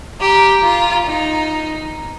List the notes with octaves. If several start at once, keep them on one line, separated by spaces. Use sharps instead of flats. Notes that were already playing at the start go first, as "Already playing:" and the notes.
G4 A#5
F4 A#5
D#4